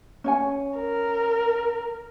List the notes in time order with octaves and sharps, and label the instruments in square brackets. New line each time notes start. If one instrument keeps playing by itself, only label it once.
[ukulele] C#4 C#5 G#5
[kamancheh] A#4